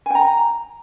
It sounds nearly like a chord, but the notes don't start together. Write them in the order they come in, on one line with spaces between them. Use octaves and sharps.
G#5 G5 A#5